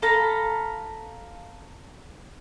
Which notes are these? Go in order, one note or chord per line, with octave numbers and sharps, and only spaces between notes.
A4 F5 A#5 B5